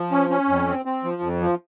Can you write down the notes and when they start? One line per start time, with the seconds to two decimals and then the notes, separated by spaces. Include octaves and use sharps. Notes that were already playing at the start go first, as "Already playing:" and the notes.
Already playing: F3
0.11 C#4
0.30 C#4
0.48 F2
0.67 C4
0.85 C4
1.04 F3
1.22 F2
1.41 F3